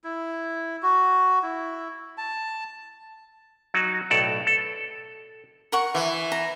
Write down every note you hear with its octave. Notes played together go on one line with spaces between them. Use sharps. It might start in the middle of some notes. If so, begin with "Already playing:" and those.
E4
F#4
E4
A5
F#3 D#4 F#4
B1 A2 A4 D5
A4
A#4 F#5 C#6
E3
A#5